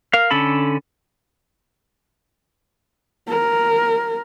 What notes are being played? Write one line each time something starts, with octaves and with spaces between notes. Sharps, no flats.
A#4 F5
D3 C#4 A4 A5 B5
A#4